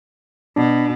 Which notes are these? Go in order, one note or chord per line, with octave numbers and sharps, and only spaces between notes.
B2 D4